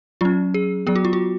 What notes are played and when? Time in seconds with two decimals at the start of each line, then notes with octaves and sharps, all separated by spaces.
0.21 F#3 C#4 F4
0.54 G#4
0.87 F#3 B3 G#4
0.96 F#4
1.05 F4
1.13 F#4